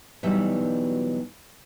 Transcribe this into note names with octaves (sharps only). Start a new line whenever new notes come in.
B2 E3 F#3 G3 D#4 E5